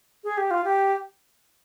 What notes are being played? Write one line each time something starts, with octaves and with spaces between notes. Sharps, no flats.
G#4
G4
F4
G4